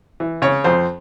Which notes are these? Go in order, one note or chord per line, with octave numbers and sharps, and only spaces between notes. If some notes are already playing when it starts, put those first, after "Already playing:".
E3
C#3 C#5
F2 C5